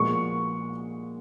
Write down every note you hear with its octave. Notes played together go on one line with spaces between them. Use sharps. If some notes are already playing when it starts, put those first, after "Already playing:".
Already playing: A#2 F3 G#3 B3 C#6